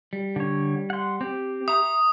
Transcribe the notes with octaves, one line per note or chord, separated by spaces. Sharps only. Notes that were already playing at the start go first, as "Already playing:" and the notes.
G3
D3 C#5
F#5 C6
C4 G4
E5 A#5 D#6